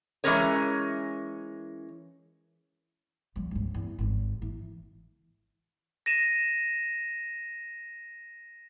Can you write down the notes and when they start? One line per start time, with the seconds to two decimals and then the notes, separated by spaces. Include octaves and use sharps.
0.24 E3 F#3 G#3 C#4 A#4 C#5
3.36 F3 G3
3.51 C#2 G2
3.74 E2
3.98 G#1 D#2
4.42 E3
6.06 A#6 D#7 E7